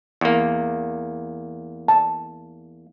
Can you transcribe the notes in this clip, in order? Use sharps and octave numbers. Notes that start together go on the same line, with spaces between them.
E2 A#3
A5